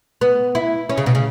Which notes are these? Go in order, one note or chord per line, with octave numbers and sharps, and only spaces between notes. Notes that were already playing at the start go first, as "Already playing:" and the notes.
B3
E4
C#4
C#3
B2
C#3